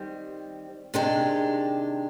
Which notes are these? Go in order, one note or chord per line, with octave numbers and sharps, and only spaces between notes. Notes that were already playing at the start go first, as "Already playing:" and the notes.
Already playing: D#3 G3 C4
C3 D#3 G#3 D4 G4